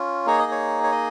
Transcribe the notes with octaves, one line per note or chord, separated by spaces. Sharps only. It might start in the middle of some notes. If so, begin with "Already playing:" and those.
Already playing: C#4 F4
A#3 D#4 G#4 C#5
D#5
C#5
C#5
D#5